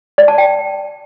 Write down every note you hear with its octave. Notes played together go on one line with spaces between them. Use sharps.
D5
A5
G5